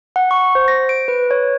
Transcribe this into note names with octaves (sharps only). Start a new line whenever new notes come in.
F#5
C#6
C5
A#6
D7
B4
C#5